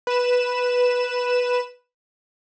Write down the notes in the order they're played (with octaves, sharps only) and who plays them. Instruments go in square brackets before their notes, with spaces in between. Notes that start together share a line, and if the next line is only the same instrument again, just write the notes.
[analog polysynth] B4 E7